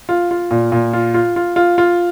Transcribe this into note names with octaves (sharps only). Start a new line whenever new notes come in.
F4
F4
A#2
A#2
F4
F4
F4
F4
F4